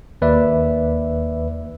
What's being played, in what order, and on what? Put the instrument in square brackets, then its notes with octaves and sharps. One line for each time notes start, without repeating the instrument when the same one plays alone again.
[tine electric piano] D#2 B4 D5 E5